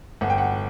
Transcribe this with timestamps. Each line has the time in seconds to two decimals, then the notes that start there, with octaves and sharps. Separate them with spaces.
0.21 G1 F#5
0.30 G5
0.38 F#5